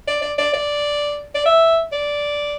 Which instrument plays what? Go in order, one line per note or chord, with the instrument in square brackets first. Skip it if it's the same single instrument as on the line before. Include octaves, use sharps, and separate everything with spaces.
[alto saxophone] D5
D5
D5
D5
D5
E5
D5